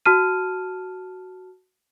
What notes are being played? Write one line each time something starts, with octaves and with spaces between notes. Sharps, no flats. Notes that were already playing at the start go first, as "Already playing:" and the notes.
F#4 A5 F6 D#7